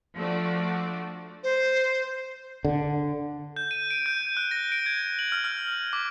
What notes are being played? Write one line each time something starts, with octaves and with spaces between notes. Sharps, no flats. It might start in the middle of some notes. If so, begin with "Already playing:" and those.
F3 A3 D4 F#4 D5
C5
D3
G6
D#7
D7
G6
F#6
A#6
D7
G#6
F#7
F6
F6
D6